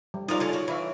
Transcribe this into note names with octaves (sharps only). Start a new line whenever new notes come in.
G3
F3 D#4 F4 A#4 D5 F5
D3 C#4
F#4
E3 C#5 E5 F5